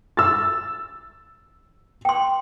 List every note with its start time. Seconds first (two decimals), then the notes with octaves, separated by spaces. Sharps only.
0.17 E6 A6
2.05 G5 C6